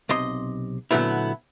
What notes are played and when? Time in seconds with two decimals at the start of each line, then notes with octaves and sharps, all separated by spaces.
0.09 B1 C3 D#5 C6
0.91 A#2 D3 F#3 A3 B3 E4